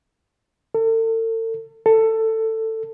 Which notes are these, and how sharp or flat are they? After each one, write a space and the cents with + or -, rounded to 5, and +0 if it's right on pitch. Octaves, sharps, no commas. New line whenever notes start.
A4 +40
A4 +15